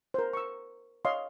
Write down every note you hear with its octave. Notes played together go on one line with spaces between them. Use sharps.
A#4 C5
C#6 E6
C#5 D#5 F5 C6